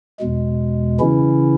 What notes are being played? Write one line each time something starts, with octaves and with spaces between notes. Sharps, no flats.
E2 B2 G#3
C#3 E3 C#4 E4